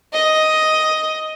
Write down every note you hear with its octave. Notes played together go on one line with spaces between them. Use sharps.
D#5